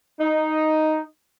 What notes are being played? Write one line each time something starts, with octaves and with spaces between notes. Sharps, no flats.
D#4